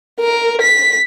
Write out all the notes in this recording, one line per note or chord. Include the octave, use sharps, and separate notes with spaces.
A#4
B6